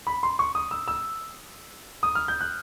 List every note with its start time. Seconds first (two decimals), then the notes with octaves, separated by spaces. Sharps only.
0.07 B5
0.23 C6
0.39 C#6
0.55 D#6
0.71 E6
0.88 E6
2.03 D#6
2.15 F6
2.28 G6
2.41 F#6